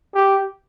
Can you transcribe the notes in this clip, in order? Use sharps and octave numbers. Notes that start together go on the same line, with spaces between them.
G4